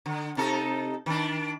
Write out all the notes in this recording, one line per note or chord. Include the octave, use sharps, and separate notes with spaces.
D3
C3 D#4 A4
D#3 D4